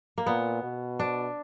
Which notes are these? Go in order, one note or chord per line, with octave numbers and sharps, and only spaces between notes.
A#3
A#2 B3
B2
D4